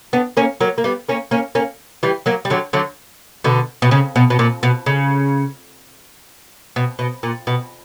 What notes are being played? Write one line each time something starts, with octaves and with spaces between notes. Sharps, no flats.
B3 D4
A#3 C#4
F#3 A#3
A#3
G3 B3
A#3 C#4
A#3 C#4
A#3 C#4
E3 G3
F#3 A#3
G3
D3 F#3
D3 F#3
B2 D3
B2
C#3
B2
B2
A#2
B2
C#3
B2
B2
A#2
B2